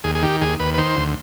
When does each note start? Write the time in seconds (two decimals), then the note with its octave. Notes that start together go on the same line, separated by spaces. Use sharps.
0.04 D#2 G#4
0.15 G#4
0.23 D#3 G4
0.41 D#2 G#4
0.60 D#2 B4
0.74 B4
0.78 D#3 C5
0.97 D2